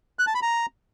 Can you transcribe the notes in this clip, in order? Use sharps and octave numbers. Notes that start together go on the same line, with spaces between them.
F#6
A5
B5
A#5